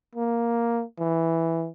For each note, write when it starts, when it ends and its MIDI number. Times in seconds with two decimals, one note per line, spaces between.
0.15 0.82 58
0.99 1.68 52